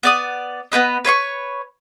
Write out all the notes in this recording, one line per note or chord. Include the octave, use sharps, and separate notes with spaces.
B3 D5 D#6
B3 G4 B4 D#5
B4 C#5 C6 C#6